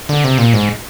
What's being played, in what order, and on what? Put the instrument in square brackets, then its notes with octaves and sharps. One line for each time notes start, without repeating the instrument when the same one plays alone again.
[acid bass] D3
C3
A#2
G#2